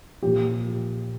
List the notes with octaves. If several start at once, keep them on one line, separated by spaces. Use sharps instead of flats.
A#2 F3 G4